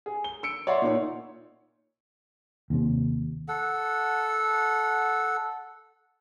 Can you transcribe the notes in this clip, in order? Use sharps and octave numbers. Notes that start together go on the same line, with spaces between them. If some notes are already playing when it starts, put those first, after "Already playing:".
G#4
G7
E6 C#7 D7
C#5 D5 E5 F#5 C6
A#2 D#4 C#5
D#2 C3
A4 F#5